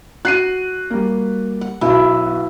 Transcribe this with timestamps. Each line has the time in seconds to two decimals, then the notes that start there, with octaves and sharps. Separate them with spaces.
0.25 F#4 F#6 C7 D#7
0.90 G3 A#3
1.61 F#5
1.81 B1 B2 F#3 B3 E4